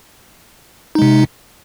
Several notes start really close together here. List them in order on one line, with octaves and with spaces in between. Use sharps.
D#4 G#3 C3